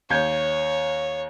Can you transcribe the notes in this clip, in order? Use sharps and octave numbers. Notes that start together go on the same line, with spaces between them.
D#2 C#5 G6 G#6